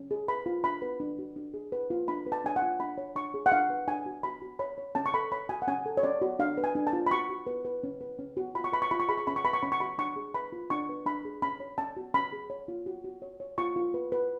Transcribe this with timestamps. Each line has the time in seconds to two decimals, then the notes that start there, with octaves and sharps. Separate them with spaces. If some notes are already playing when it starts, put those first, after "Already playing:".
Already playing: C#4
0.11 G#4
0.28 B4 B5
0.46 F4
0.64 D4 B5
0.82 B4
1.00 D4
1.19 F#4
1.36 D4
1.54 G#4
1.72 B4
1.90 F4
2.08 D4 B5
2.27 B4
2.32 A5
2.45 D4 G#5
2.56 F#5
2.62 F4
2.80 D4 B5
2.98 C#5
3.15 D4 C#6
3.34 G#4
3.46 F#5
3.52 D4 F5
3.70 B4
3.88 D4 G#5
4.06 F#4
4.23 F#4 B5
4.42 F#4
4.59 C#5 B5
4.78 C#5
4.95 C#4 A5
5.06 C#6
5.14 A4 B5
5.32 C#5 B5
5.49 F#4 G#5
5.62 F#5
5.68 C#4 G#5
5.86 A4
5.97 C#5
6.03 C#4 D5
6.22 F#4
6.39 D4 F5
6.58 B4
6.64 G#5
6.75 D4
6.87 A5
6.93 F4
7.07 B5
7.11 F#4 C#6
7.29 F#4
7.47 B4
7.65 B4
7.84 C#4
8.01 B4
8.19 C#4
8.37 F#4
8.55 F4 B5
8.64 C#6
8.73 B4 B5
8.82 C#6
8.91 F4 B5
9.00 C#6
9.09 G#4 B5
9.18 C#6
9.27 C#4 B5
9.36 C#6
9.45 B4 B5
9.53 C#6
9.63 C#4 B5
9.72 C#6
9.80 F#4 B5
9.98 D4 C#6
10.16 G#4
10.34 B4 B5
10.52 F4
10.70 D4 C#6
10.89 B4
11.06 D4 B5
11.25 G#4
11.42 C#4 B5
11.60 C#5
11.78 C#4 A5
11.97 F#4
12.14 C#4 B5
12.32 G#4
12.50 C#5
12.68 F4
12.86 F#4
13.04 F#4
13.22 C#5
13.40 C#5
13.58 F4 C#6
13.76 F4
13.94 B4
14.12 B4